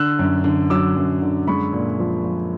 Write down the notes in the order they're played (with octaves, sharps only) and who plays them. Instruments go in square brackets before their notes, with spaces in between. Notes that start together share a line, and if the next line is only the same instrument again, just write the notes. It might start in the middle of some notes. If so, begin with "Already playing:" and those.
Already playing: [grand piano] D3 E6 F#6
F#2
D3
F#3 D6 E6
F#2
D3
G#3 B5 C#6
A#2
F3
F3